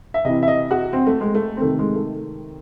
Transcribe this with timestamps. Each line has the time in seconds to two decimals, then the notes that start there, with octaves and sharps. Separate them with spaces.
0.14 E5
0.25 C3 E3 D#5
0.43 E5
0.48 D#5
0.71 F#4
0.93 C4
1.07 A3
1.21 G#3
1.35 A3
1.57 C4
1.61 C3 D#3 A3
1.79 G#3
1.95 A3